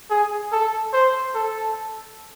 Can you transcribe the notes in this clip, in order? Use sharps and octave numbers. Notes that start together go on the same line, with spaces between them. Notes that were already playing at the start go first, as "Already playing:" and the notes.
G#4
A4
C5
A4